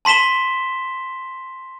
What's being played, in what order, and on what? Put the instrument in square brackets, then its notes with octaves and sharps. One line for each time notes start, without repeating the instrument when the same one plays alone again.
[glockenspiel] A5 C6 B6 E7 G7